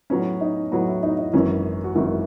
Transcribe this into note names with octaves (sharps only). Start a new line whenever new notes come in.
A2 F#3 B3 C#4
D#4
A2 F#3 B3 F#4
E4
D#4
D#4
G#1 F#2 E3 C#4
F#4
G#1 F#2 E3 E4